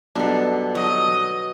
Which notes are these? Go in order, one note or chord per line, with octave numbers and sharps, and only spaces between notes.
B1 G2 B2 D4 A4
F#3 D#5